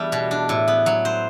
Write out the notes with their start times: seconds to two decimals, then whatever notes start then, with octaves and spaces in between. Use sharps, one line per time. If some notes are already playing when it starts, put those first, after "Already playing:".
Already playing: E2 G3 A3 D4 E4
0.12 B2
0.31 D4
0.49 A2
0.68 B3
0.86 F#3
1.05 C5